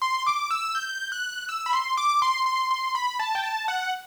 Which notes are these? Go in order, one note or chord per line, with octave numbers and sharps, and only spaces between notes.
C6
D6
E6
G6
F#6
E6
B5
C6
D6
C6
C6
C6
B5
A5
G5
A5
F#5